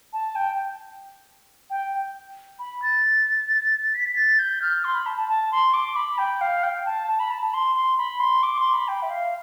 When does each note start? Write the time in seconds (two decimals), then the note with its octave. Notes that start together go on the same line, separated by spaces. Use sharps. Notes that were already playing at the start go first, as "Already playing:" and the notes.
0.13 A5
0.35 G5
1.70 G5
2.59 B5
2.82 A6
3.94 B6
4.16 A6
4.39 G6
4.62 F6
4.84 C6
4.94 B5
5.06 A5
5.17 A5
5.29 A5
5.52 C6
5.73 D6
5.96 B5
6.18 G5
6.41 F5
6.63 G5
6.86 A5
7.08 A5
7.20 B5
7.31 A5
7.42 A5
7.53 C6
7.75 C6
7.98 B5
8.20 C6
8.43 D6
8.58 C6
8.73 B5
8.88 G5
9.02 E5
9.10 F5